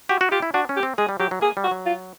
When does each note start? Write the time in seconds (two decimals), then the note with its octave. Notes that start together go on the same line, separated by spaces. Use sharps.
0.09 F#4 G4
0.21 F#4
0.31 F4 G4
0.42 E4
0.54 D4 F#4
0.69 C#4
0.76 G4
0.83 C4
0.98 G#3 G#4
1.09 G3
1.20 F#3 G4
1.31 F#3
1.41 A#3 G#4
1.57 G3
1.64 F#4
1.71 F#3
1.86 F4